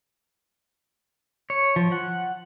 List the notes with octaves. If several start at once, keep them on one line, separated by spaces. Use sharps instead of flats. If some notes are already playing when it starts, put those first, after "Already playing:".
C#5
F3
F#5